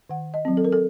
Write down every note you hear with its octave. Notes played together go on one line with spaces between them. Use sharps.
D#3 F#5
D#5
F#3 C4
A4
A#4
A4